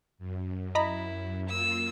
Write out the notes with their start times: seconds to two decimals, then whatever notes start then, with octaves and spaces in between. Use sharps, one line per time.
0.18 F#2
0.75 E4 D#5 A#5 B5
1.48 A#3 F4 E6